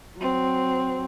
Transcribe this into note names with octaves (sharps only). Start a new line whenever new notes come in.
F#3 C4